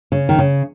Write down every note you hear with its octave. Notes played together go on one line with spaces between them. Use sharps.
C#3
D#3
C#3